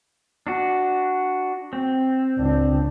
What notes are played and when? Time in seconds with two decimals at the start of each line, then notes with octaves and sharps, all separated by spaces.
0.47 D4 F#4
1.73 C4
2.38 C#2 D4